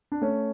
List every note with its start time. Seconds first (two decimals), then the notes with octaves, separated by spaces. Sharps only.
0.12 D4
0.21 A3 C#4